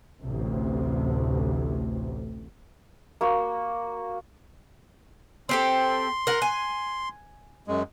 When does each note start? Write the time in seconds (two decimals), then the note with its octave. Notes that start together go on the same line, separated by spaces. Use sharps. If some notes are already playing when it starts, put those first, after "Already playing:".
0.21 A1 D2 C3
3.21 A#3 F#4
5.49 C4 G4 A4 C6
6.27 A#4 F#5
6.42 G#5
7.68 F#2 G#3